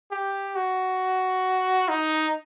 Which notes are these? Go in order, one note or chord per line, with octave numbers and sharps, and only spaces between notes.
G4
F#4
D#4